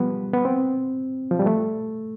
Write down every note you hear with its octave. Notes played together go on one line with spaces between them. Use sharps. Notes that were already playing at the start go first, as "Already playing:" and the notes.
Already playing: F3 G3 B3
B3
C4
F3
G3
A3